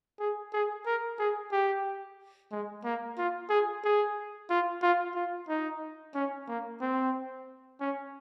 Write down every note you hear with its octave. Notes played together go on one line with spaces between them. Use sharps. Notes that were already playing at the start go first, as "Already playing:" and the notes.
G#4
G#4
A#4
G#4
G4
G#3
A#3
F4
G#4
G#4
F4
F4
F4
D#4
C#4
A#3
C4
C#4